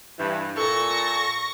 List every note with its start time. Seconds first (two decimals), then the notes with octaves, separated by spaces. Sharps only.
0.19 G2 E3
0.58 A#2 A4 C#6 A#6